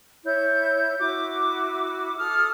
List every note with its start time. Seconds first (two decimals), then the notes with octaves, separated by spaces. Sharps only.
0.25 E4 C#5 G6
0.99 E4 F#4 D6
2.18 A4 D#6 F6